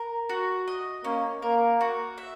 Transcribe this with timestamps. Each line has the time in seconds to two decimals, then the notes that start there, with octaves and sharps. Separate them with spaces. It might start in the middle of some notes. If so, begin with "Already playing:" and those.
Already playing: A#4
0.29 F#4
0.68 D#5
1.05 A#3 C#4
1.42 A#3 A#4
1.81 F#4
2.18 E5